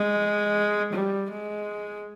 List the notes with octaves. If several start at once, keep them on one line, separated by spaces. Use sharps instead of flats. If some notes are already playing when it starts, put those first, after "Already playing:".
Already playing: G#3
G3
G#3